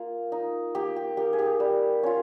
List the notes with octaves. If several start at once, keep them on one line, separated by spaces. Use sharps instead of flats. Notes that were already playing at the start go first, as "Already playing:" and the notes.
Already playing: A#3 F4
D#4
A#3 G4
G4
D#4 G4 A#4
G#4
G4
G3
C#4 F4